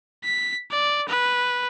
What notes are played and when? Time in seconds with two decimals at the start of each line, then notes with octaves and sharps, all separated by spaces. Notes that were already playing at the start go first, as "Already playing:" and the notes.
0.24 B6
0.71 D5
1.09 B4